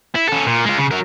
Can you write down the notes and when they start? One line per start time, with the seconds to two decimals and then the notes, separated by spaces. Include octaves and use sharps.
0.15 E4
0.29 C#4 A4
0.47 A#2
0.65 G#3 F4
0.78 C#3
0.91 F#3 A#4